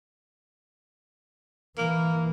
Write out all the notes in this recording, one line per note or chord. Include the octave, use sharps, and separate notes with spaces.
E3 A#3